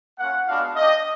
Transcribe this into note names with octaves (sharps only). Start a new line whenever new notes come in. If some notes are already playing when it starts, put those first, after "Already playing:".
A#3 C#4 F4 F#5
G#3 B3 D4 F#4 F5
A3 D4 G4 D#5